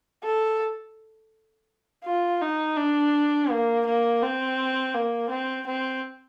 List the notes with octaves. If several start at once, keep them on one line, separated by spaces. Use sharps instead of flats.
A4
F4
D#4
D4
A#3
A#3
C4
A#3
C4
C4